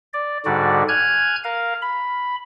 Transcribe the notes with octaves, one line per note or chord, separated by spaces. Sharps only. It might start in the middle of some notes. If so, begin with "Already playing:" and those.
D5
G#2 D3 G3 F#4 D5
G#5 F6 F#6 G#6
A#4 F5
B5